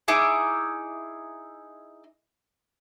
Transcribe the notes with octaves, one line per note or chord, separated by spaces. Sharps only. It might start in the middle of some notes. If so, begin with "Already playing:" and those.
D#4 E4 G#4 D6